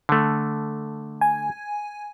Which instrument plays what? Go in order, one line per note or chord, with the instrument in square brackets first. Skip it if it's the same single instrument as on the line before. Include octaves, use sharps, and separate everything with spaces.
[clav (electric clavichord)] D3 A3
[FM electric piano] G#5